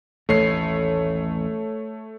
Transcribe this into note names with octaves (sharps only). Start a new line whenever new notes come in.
A1 D#2 A3 C#5 C7